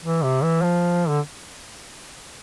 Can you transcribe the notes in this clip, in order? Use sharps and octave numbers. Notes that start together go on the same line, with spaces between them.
E3
C3
E3
F3
D3